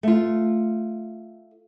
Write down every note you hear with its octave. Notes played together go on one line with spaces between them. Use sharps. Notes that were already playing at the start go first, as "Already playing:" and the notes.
A3 F4